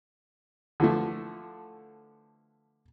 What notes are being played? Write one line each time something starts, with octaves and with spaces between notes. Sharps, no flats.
D3 E3 F3 A3